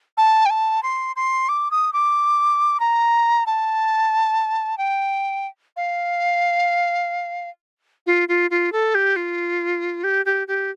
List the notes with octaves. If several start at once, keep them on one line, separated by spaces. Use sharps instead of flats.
A5
G5
A5
C6
C6
D6
D#6
D6
A#5
A5
G5
F5
F4
F4
F4
A4
G4
F4
G4
G4
G4